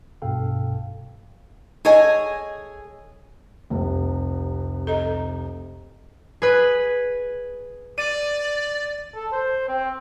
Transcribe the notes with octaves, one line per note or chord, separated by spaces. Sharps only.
B1 G2 B2 A4 F5 G5
G#4 A4 C#5 D#5 G#5
F1 C2
A4 D#5 A#5
G#4 B4
D5 D#7
A4
C5
C4